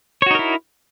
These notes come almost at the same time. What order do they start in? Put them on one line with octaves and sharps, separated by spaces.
C#5 F#4 D#4 A#4 E4